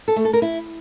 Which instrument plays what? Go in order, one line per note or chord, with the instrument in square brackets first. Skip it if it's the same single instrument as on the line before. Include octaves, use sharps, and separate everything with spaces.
[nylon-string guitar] A4
A3
A4
A#4
E4